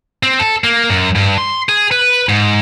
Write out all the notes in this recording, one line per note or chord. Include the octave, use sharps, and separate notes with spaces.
C4
A4
A#3
F#2
G2
C6
G#4
B4
G#2